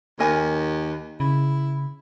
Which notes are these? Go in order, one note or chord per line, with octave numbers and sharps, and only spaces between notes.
D#2 A#4 D#5 G#5
C#3 E4